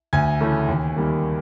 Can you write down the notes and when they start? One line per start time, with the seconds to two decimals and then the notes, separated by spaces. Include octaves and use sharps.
0.13 D2 G#5 G#6
0.40 C#3 E3 A3
0.68 D#2
0.96 D#3 G3 A#3